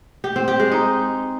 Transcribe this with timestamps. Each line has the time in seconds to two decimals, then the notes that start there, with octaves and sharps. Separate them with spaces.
0.24 G4
0.36 C4
0.48 G4
0.60 G#3
0.72 D#4